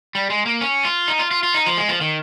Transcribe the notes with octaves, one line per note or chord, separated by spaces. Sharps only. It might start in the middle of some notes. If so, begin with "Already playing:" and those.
G3
G#3
A#3
C#4
F4
D#4
F4
F4
F4
D#4
F3
G#3
F3
D#3